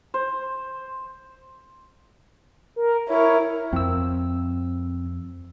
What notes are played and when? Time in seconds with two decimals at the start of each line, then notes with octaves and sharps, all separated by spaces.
0.14 C5
2.76 A#4
3.08 E4 A#4 C#5
3.73 F2 C4 E6